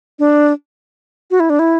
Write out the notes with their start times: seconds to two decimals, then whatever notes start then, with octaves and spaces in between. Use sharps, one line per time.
0.19 D4
1.31 F#4
1.40 E4
1.50 D4
1.59 E4